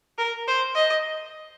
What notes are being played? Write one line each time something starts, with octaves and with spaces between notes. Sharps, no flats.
A#4
C5
D#5